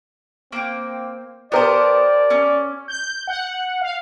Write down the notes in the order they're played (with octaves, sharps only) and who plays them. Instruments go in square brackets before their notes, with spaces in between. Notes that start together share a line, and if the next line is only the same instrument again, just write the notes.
[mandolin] A#3 G5 [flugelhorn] C4
[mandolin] B3 C5 [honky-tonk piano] G4 A#4 A5 [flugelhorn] D5
[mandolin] C#4
[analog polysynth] G6
F#5
F5